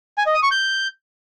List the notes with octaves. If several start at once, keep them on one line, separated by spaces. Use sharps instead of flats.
G#5
D#5
D#6
C#6
G6